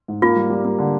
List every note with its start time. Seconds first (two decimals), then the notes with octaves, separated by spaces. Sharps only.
0.08 G#2
0.22 A#3 F4
0.36 G3
0.50 G3
0.64 A#3
0.79 D3